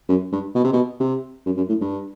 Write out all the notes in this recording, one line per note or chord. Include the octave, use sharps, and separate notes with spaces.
F#2
G2
B2
C3
B2
C3
F#2
F#2
A2
G2